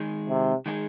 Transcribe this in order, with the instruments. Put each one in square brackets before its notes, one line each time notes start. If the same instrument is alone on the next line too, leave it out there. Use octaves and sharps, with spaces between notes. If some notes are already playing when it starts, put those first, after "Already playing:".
Already playing: [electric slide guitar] D#3 G#3 D#4 G#4
[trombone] C3
[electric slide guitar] D#3 G#3 D#4 G#4